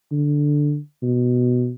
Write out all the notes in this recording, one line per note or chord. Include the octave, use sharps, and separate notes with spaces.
D3
B2